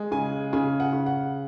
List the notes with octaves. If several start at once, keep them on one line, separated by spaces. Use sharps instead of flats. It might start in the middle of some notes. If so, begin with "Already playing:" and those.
Already playing: G#3
C#3 G#5
C#3 G#5
F#5
C#3
F#5